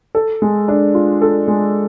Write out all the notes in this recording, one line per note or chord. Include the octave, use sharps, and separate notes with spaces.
A4
G#3
D4
F4
A4
G#3